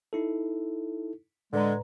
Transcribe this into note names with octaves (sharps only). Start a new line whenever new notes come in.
D#4 E4 A4
A2 D3 G#3 B4 A#5